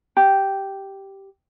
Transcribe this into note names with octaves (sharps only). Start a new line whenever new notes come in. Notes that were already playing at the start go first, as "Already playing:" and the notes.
G4